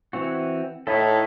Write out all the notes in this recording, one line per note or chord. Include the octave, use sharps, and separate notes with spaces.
E3 C4 F#4
A2 D#4 E4 A4